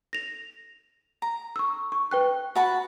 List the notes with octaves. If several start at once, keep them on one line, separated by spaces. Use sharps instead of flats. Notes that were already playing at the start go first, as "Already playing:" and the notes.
A#6 F7
A#5
C#6 E6
C#6
B4 G5 F#6
F#4 A5 B5